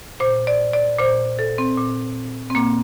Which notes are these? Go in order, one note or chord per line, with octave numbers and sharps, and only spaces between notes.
A#2 C5
D5
D5
A#2 C5
A4
C4
A#2
C4
A#2 A#3